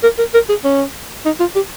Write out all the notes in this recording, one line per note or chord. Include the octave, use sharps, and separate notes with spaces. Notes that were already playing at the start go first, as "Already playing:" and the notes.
A#4
A#4
A#4
G#4
C#4
D#4
F4
G4